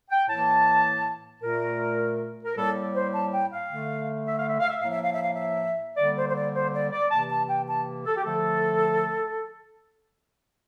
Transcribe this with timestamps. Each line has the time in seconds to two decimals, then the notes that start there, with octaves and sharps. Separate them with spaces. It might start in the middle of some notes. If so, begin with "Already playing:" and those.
0.10 G5
0.29 A2 E3 A#3 A5
1.42 A#2 A3 A#4
2.45 A#4
2.56 A2 G3 A#3 A4
2.94 C5
3.13 A5
3.32 G5
3.52 F5
3.70 D3 A3
4.27 E5
4.38 F5
4.49 E5
4.60 F5
4.69 E5
4.81 A2 F3 A#3 F5
4.91 E5
5.02 F5
5.13 E5
5.23 F5
5.34 E5
5.97 D3 G3 A#3 D5
6.16 C5
6.29 C5
6.35 D5
6.54 C5
6.74 D5
6.92 D5
7.11 C3 E3 A#3 A5
7.31 A5
7.49 G5
7.68 A5
8.06 A4
8.17 G4
8.24 D3 F3 A3 A4